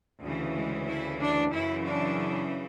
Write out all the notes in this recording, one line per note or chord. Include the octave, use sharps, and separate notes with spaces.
D2 C#3 E3
G#3
E4
D4
F#2 C#3 E3 E4
D4